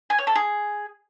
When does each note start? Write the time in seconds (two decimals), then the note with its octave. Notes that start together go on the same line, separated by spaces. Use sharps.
0.10 G#5
0.19 C#5
0.27 A4
0.35 G#4